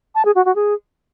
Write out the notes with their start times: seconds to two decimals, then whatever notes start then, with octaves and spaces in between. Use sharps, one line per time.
0.15 A5
0.25 G#4
0.35 F#4
0.45 F#4
0.55 G#4